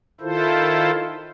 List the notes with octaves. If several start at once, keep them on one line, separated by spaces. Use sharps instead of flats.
D#3 E4 F4 A4 C5